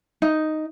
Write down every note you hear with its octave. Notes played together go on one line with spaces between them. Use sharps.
D#4